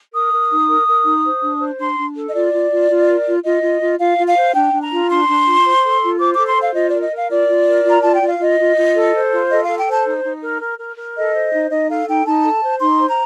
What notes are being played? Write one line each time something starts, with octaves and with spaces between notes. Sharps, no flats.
A#4 D#6
A#4
D#4
A#4
A#4
D#4
C5
D4
C5
D4 C6
D4
A4
D#5
F4 D5
F4
F4
F4
A#4
F4
F4 D#5
F4
F4
F4 F5
F4
F5
C5
D4 G5
D4
A#5
F4
D4 C6
D4
F4
C5
A4
F4
C5 D6
D6
A4
C6
C5 F5
F4 D#5
A#4 D5
D#5
A#4 F5
F4 D5
F4
A#4
F4 A#5
F4 A5
G5
F4
F5
F4 D#5
F4
F4
A4
C5
F4
A4 D#5
A4 F5
G5
C5 A5
D#4
D#4
A#4
A#4
A#4
A#4
A4 D#5
C5
D#4
D#4 D#5
A4 F5
D#4 G5
D#4 A5
A4
C5
D#4 C6
C5
A#5